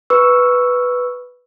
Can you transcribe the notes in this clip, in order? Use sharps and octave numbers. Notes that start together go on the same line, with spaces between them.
B4 C#6 E6